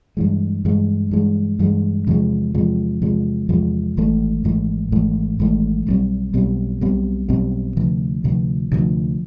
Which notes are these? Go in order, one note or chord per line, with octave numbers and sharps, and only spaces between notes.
G2 E3 G#3
G2 E3 G#3
G2 E3 G#3
G2 E3 G#3
E2 C3 F3 G#3
E2 C3 F3 G#3
E2 C3 F3 G#3
E2 C3 F3 G#3
G#1 G#2 E3 A3
G#1 G#2 E3 A3
G#1 G#2 E3 A3
G#1 G#2 E3 A3
B1 B2 G3 C4
B1 B2 G3 C4
B1 B2 G3 C4
B1 B2 G3 C4
D2 C3 F3
D2 C3 F3
D2 C3 F3